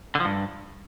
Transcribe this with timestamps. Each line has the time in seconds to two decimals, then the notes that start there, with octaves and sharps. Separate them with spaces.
0.15 D3
0.20 F3
0.25 G2